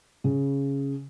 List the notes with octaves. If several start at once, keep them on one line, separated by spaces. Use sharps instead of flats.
C#3